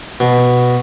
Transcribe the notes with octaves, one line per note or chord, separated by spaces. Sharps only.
B2